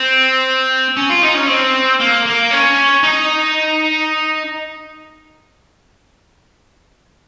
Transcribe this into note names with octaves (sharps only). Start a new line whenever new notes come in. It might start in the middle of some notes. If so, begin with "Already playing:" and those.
Already playing: C4
C#4
F4
D#4
C#4
C4
A#3
A#3
C#4
D#4